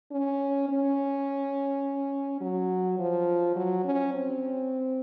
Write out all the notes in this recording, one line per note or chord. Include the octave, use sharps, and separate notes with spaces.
C#4
C#4
F#3
F3
F#3
C#4
C4